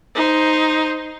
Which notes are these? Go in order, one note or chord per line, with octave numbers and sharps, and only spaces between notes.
D#4 C5